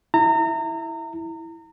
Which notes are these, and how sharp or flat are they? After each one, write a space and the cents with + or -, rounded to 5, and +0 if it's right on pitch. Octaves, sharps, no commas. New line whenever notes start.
E4 +0 A#5 -30